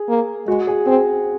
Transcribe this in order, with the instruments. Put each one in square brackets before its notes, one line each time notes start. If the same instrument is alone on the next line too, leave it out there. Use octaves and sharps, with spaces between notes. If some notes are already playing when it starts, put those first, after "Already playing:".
Already playing: [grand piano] G#4
[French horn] A#3
[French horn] G#3 [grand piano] F#4
[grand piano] G#4
[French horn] C4 [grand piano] G#4